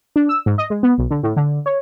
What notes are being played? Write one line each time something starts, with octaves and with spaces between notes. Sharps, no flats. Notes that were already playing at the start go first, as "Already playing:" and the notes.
D4
E6
G#2
D#5
G#3
B3
B1
D3
A2
D3
C#5